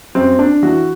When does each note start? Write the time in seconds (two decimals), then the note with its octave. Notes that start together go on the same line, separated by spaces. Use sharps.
0.15 F#2 C4
0.39 D4
0.63 E3 F#4